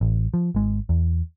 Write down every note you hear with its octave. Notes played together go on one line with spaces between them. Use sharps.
A1
F3
G#1 G#3
E2